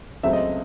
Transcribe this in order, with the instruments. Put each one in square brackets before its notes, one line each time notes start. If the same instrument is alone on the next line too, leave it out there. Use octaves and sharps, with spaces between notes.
[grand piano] C#2 C#3 F#3 A3 C4 [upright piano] E5
[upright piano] D#5